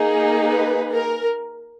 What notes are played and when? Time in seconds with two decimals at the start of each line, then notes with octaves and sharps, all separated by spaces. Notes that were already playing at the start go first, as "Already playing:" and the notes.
Already playing: A#3 D#4 G#4
0.49 B4
0.93 A#4